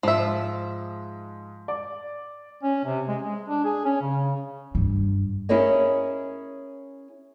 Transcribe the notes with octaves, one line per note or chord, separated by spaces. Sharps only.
G#2 F3 E5
D5
C#4
C3
G#3
G#3
D4
G#4
C#4
C#3
G2
C#4 E4 G#4 A#4 C#5 D#5